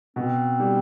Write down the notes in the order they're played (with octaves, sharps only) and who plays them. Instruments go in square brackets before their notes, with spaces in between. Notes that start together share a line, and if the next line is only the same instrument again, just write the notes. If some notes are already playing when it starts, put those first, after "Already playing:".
[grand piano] B2 [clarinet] C4
[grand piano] G3